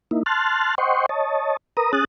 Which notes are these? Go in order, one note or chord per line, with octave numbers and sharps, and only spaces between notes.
A#3 D#4 E4
A5 C6 F6 F#6 A6
C5 D#5 F#5 G5 C6 C#6
C#5 D#5 A5
A#4 B4 A#5 D#6
C#4 G#4 D#6 F#6 A6